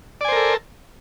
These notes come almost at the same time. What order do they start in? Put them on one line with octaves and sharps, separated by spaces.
D5 G#5 C5 A#4 A4